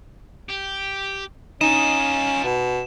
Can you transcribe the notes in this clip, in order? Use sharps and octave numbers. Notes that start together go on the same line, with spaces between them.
G4
C#4 D#4 F4 D#5 E7
B2